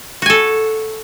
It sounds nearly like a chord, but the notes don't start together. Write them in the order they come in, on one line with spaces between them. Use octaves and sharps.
F#4 G#5 A4